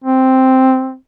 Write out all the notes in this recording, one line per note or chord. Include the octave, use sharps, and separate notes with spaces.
C4